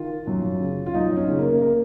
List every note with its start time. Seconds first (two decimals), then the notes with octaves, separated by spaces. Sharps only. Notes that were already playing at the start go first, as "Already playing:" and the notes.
Already playing: D#3 F4
0.27 F#2
0.61 C#3
0.86 F4
0.95 F#2 D#4
1.17 C#4
1.28 C#3
1.39 A#3
1.62 A#3